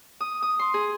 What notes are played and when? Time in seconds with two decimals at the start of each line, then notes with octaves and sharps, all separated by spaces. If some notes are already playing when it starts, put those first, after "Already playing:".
0.21 D#6
0.42 D#6
0.59 C6
0.74 G#4